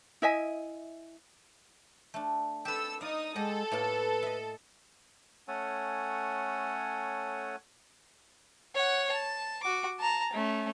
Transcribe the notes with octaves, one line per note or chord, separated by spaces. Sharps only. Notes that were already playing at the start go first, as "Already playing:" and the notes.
E4 D#5 E5 G#5
A3 D4
G4 A4 B4 E6
D#4 D5 F5 D#6
G#3 G4 A4 D#5 F#5
A2 A#3 B4 A5
D#5 E5
A3 C#4 A4 C#5 F#5 G#5
C#5 F#5
A5
F#4 D6
A5 A#5
A3 C#4